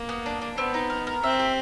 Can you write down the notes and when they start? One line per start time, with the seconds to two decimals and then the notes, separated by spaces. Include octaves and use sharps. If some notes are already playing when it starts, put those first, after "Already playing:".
Already playing: A#3
0.09 B3
0.26 D4
0.42 D4
0.58 B3 C4
0.74 D#4
0.90 A#4
1.07 A#4
1.23 C4 E5
1.39 G4